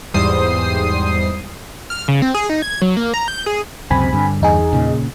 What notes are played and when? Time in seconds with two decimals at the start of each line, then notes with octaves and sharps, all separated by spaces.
0.14 E2 G#2 G3 C5 D#6 C7
1.90 F6
2.08 C#3
2.22 C4
2.34 G#4
2.50 D#4
2.62 G#6
2.82 F#3
2.97 A#3
3.14 A#5
3.28 G6
3.46 G#4
3.90 C#2 F#2 C3 C4 G#5 B5
4.13 G2 D3
4.41 E2 D#4 G#4
4.73 A#2 C#3